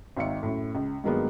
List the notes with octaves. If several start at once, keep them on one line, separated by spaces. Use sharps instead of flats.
G#1 D#3 E5 F5 C#7
F#2 A2
C#2
G2 D#3 F#3 G#3 A#3 B3